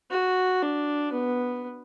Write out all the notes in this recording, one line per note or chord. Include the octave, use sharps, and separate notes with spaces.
F#4
D4
B3